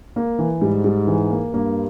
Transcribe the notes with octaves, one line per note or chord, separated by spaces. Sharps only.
A#3
E3
G#2 G3
G3
E3
A#3
G2 A#3